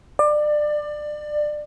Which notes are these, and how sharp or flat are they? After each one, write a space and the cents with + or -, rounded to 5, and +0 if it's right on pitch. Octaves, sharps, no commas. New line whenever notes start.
D5 +25